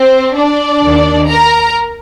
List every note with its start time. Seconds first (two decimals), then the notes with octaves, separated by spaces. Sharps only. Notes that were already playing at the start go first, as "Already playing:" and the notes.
Already playing: C4 C5
0.35 D4 D5
0.82 D#2 D#3
1.28 A#4 A#5